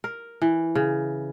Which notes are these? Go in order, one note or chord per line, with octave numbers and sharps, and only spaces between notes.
A#4
E3
C#3